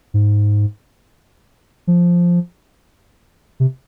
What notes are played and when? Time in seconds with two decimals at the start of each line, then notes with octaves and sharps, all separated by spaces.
0.14 G#2
1.87 F3
3.60 C3